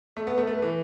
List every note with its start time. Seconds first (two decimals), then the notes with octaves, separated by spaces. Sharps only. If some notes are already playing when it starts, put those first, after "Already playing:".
0.17 A3 A4
0.27 B3
0.33 A3 B4
0.43 A3 A4
0.53 B4
0.62 E3